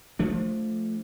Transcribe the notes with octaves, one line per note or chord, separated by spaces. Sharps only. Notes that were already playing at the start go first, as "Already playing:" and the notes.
F3 A3 D4